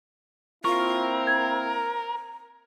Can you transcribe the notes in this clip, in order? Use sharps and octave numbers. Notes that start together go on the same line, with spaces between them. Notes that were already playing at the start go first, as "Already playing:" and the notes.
A#3 C4 E4 F4 A#4 C#6
A#5 G#6